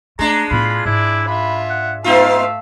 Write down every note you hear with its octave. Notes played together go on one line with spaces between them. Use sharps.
G#3 A3 D4 A#5
A2 B3 F4 B5
G#2 E4 D5 E5
F4 E5 B5
F#5
A3 B3 D#4 F4 E5 F5